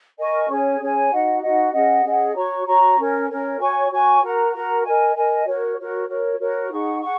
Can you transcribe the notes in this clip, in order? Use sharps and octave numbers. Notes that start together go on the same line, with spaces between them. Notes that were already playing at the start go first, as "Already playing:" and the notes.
A#4 D#5 G#5 C#6
C#4 G#4 C#5 G#5
C#4 G#4 C#5 G#5
D#4 F#4 D#5 F#5
D#4 F#4 D#5 F#5
C#4 G#4 D#5 F#5
C#4 G#4 D#5 F#5
F#4 C#5 A#5 C#6
F#4 C#5 A#5 C#6
C#4 A#4 C#5
C#4 A#4 C#5
F#4 C#5 G#5 C#6
F#4 C#5 G#5 C#6
F#4 A#4 F#5 A#5
F#4 A#4 F#5 A#5
A#4 D#5 G#5
A#4 D#5 G#5
F#4 A#4 C#5
F#4 A#4 C#5
F#4 A#4 C#5
F#4 A#4 C#5
D#4 G#4 F#5 C#6
G#4 F#5 C#6